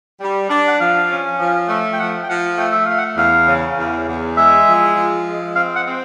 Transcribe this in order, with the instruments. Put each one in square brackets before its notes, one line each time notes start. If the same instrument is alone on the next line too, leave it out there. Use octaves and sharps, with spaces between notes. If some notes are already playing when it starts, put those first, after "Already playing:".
[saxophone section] G3
D4
[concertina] F#5
[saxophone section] F3 [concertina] F5
[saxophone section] C#4
F3
A3
[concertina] G5
[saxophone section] F3 [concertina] F#5
[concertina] G5
[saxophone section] F3 [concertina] F#5
[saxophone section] A3 [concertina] G5
[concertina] E5
[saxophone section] A3 [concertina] F5
[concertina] F#5
[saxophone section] E2 [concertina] F5
[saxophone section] C#3
E2
E2
[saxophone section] G#3 [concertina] E5
[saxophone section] F3
F3
G#3
[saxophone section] C4 [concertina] F5
[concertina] F#5
[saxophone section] C4